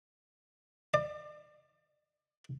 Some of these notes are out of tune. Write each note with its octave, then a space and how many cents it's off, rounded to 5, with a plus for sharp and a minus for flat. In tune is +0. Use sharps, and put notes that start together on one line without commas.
D5 +35